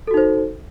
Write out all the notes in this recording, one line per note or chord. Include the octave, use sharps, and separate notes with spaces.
D#4 F#4 A4 C5